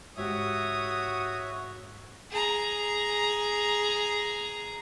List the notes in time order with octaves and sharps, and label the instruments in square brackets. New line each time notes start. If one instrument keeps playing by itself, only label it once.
[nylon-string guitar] G#2 G4 [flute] F#4 [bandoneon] C#5 E5 [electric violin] D#6
[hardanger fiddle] G#4 A#5